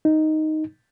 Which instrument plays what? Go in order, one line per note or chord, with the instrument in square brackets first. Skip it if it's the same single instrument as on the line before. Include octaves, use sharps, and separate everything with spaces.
[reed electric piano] D#4